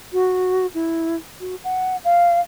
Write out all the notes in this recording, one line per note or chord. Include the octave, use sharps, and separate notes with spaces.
F#4
E4
F#4
F#5
F5